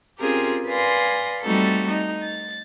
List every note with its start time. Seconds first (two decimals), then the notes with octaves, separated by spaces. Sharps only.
0.20 C4 C#4 F4 G4 G#4 A#4
0.67 B4 D5 F5 G#5 C6 A#6
1.43 G3 A3 C4 D#4 F#4 A4
1.87 D#4
2.23 A6